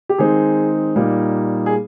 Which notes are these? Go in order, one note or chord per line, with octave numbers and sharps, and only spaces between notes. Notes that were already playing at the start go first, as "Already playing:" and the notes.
G4
D#3 G#3 C4 D#4 G#4
A#2 G3 A#3 D#4
G#4